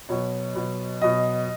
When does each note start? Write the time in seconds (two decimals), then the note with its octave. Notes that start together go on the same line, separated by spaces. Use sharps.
0.09 B2 F#3 C#5
0.55 B2 F#3
1.01 B2 F#3 D#5